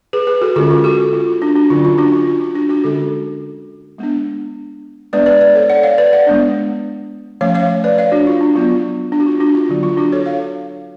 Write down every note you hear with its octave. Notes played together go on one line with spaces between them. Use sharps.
G#4 B4
G#4 B4
F#4 A4
D3 G#3 C#4 F4 G#4
F4 G#4
F#4 A4
F4
F4
D4 F#4
D4 F#4
D3 F#3 C#4 F4
F4
D4 F#4
F4
F4
F4
D4 F#4
D4 F#4
D3 G#3 C#4 F#4 A4
G#3 B3 D4
G#3 B3 D4 B4 D5
B4 D5
B4 D5
A4 C#5
D5 F#5
C#5 F5
B4 D5
D5 F#5
G#3 B3 D4
F3 A3 C#4 C#5 F5
C#5 F5
B4 D5
C#5 F5
D4 F#4
F4
D4
F#3 B3 D4 F4
D4
F#4
F4
D4 F#4
F4
D3 F#3 B3 F4
F4
D4 F#4
A4 C#5
C#5 F5